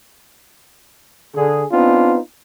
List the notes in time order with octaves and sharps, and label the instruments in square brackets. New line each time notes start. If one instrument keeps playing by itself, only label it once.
[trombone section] D3 G#4
B3 C4 D4 D#4 F4